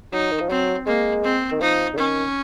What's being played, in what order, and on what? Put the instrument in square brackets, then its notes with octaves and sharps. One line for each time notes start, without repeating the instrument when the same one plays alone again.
[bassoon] F#3 [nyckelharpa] D#4
[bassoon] D#3
F3
[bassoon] F#3 [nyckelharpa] C4
[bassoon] G#3 [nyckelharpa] A#3
[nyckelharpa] C4
[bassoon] D#3
[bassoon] F3 [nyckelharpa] D#4
[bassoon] C#3
[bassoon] D#3 [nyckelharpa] C#4